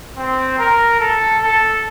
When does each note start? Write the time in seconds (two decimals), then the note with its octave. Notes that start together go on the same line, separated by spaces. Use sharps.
0.17 C4
0.59 A#4
1.00 A4
1.42 A4